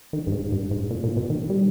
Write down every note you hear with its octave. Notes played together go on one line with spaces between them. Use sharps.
D#3
G2
G#2
G2
G#2
A#2
A#2
B2
D#3
G3